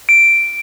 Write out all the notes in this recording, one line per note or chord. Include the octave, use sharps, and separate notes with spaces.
D7